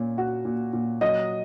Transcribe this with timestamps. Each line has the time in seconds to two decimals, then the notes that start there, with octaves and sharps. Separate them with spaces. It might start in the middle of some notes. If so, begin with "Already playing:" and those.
Already playing: A#2 C#4
0.18 F#4
0.45 A#2
0.73 A#2
1.01 F#3 D#5